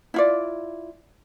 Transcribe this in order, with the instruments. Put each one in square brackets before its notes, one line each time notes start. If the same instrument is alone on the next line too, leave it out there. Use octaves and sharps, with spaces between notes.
[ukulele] E4 F4 D5